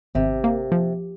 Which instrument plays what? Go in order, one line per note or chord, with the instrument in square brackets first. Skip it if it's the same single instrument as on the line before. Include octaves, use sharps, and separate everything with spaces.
[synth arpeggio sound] G#1 [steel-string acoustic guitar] C3
[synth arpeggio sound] A#3
F3